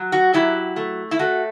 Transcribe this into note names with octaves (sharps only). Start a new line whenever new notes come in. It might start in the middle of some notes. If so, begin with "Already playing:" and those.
Already playing: F#3
F#4
F#3 E4 G4
A3
E4
A3 F#4